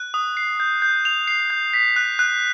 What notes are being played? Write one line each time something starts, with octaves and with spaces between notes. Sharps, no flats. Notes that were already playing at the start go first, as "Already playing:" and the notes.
Already playing: F#6
D#6
C7
G6
G6
F7
C7
G6
B6
F#6
F#6